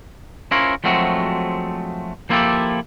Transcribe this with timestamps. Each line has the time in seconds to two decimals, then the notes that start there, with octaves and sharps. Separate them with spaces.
0.51 C#4 E4 F4 A#4 C5 C#5
0.84 F3 F#3 G#3 A3 C4 F#4
2.29 F3 A#3 E4 F4 G4 A4